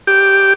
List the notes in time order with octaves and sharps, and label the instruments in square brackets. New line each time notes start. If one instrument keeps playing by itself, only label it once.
[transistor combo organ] G4